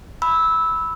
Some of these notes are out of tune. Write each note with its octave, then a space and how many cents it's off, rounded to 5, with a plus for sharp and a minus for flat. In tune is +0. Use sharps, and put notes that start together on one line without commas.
B5 +0 E6 -15